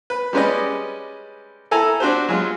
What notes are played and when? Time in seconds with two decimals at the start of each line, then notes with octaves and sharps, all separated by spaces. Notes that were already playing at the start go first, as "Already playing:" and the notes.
0.10 B4
0.33 G3 G#3 C#4 B4 D5 D#5
1.71 E4 A4 G#5 A#5
2.00 D4 F#4 G4 C5
2.29 F#3 G#3 F4